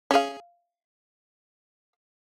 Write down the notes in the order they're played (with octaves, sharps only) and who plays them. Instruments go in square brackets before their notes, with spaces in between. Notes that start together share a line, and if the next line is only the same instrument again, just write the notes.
[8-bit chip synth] C#4 G#4 [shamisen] E5 F5